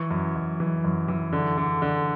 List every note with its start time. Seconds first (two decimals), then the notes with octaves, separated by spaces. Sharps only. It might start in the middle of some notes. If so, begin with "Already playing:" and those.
Already playing: E3 C#6
0.11 F#2
0.36 F#2
0.60 E3
0.84 F#2
1.08 E3
1.33 D3
1.58 D3
1.82 D3